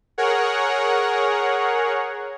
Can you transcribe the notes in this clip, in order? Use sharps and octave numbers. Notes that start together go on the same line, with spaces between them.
G#4 A#4 C#5 F#5